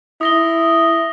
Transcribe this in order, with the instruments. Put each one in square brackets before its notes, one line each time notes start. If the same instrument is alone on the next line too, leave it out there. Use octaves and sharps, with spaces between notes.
[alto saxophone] E4 [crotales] D#6 A#6 G7